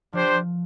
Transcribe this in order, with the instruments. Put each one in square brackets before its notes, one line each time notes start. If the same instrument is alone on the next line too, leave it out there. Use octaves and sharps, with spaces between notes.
[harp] F3 [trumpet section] D4 G4 C5